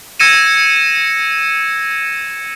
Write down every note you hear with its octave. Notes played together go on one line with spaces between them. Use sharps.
E6 G#6 A#6 C#7 D#7 E7